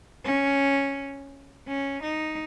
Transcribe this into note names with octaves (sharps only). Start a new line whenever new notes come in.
C#4
C#4
D#4